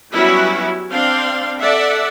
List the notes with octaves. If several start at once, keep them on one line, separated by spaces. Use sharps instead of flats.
F#3 G3 B3 C#4 E4 F#4
C4 D4 F5 C6
A4 D5 E5 F#5